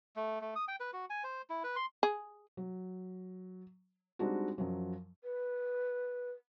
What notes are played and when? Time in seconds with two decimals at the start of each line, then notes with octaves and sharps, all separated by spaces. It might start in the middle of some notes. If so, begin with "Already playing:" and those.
0.16 A3
0.41 A3
0.56 D#6
0.68 G5
0.80 B4
0.93 F#4
1.10 G#5
1.24 C5
1.50 E4
1.64 B4
1.76 C6
2.03 G#4
2.57 F#3
4.19 G3 G#3 C4 D4 D#4 F#4
4.58 F#2 F3 F#3
5.23 B4